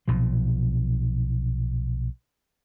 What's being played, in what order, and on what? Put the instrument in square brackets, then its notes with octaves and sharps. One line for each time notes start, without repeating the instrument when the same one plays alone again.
[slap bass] B1 A#2 F3